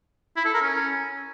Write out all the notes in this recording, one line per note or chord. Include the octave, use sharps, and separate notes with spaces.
E4
A4
A#4
C#4